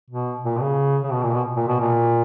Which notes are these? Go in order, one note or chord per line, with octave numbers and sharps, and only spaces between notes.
B2
A#2
B2
C#3
C#3
B2
A#2
B2
A#2
B2
A#2